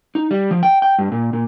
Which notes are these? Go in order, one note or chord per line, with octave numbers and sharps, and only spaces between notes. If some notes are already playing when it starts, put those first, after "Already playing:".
D#4
G3
F3
G5
G5
G2
A#2
A#2